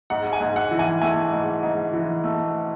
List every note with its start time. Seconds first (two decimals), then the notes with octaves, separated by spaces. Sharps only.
0.10 G#2 F#5
0.33 G#5
0.41 G#2
0.56 F#5
0.71 E3
0.79 G#5
1.01 A3 G#5
1.32 G#2
1.63 G#2
1.93 E3
2.24 A3